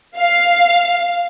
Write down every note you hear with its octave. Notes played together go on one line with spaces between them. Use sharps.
F5